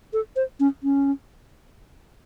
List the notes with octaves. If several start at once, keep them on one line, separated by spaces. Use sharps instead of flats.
A4
C5
C#4
C#4